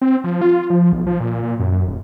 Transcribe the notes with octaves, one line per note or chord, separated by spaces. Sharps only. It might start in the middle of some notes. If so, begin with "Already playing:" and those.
C4
F3
F4
F3
B1
F3
A#2
A#2
F#2
D#1